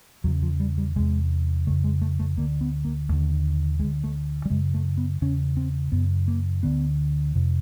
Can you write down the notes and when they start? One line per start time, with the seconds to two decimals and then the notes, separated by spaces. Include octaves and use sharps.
0.24 E2 F#3
0.27 C#3
0.42 F3
0.60 G3
0.78 G3
0.96 E2 C3 G#3
1.67 F2 C#3 A3
1.84 G#3
2.01 A3
2.19 A3
2.37 D2 D3 A#3
2.61 B3
2.85 A#3
3.09 D#2 D3 A3
3.79 D2 G#3
3.84 D3
4.04 A3
4.46 G3
4.50 F#2 C#3 G#3
4.74 A3
4.97 B3
5.21 E2 C#3 C#4
5.57 C4
5.92 F#2 C#3 B3
6.28 A#3
6.63 D2 D3 B3
7.35 F2 C3